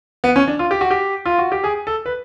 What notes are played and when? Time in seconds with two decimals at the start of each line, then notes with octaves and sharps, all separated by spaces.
0.24 B3
0.36 C#4
0.48 D4
0.59 F4
0.71 G4
0.81 F#4
0.91 G4
1.25 F4
1.39 F#4
1.52 G4
1.64 G#4
1.87 A4
2.06 B4